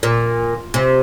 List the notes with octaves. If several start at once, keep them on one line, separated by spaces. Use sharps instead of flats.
A#2
C3